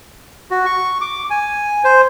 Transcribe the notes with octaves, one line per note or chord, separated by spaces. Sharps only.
F#4
C#6
D6
G#5
C5